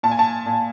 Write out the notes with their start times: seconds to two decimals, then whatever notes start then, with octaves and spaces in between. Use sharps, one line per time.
0.03 A#2 A5
0.11 G#5
0.19 A5
0.46 A#2